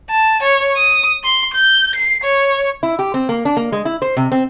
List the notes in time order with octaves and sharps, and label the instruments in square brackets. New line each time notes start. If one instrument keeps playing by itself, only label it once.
[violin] A5
C#5
D#6
C6
G6
C7
C#5
[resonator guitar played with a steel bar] E4
G4
C4
A#3
D4
A#3
G#3
E4
C5
C3
C4